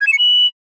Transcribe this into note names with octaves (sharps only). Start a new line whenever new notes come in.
G#6
E7
C#7
F#7